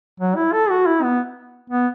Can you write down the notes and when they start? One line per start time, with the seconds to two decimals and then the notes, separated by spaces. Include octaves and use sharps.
0.20 F#3
0.35 E4
0.52 A4
0.70 F#4
0.86 E4
1.03 B3
1.70 B3